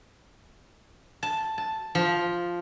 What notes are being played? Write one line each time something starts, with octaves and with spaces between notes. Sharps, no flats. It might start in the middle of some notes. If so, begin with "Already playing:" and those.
A5
A5
F3